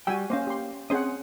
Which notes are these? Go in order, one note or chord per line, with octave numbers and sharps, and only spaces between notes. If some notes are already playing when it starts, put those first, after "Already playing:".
G3 F#4 G5 G#5 E6
A#3 C#4 C5 D#5 F5
G4 C6
C4 C#4 G#4 C5 D#5 F#5